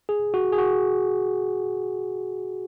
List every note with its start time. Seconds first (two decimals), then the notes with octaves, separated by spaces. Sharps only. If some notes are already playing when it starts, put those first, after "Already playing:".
0.09 G#4
0.34 F#4
0.52 G#4
0.58 F#4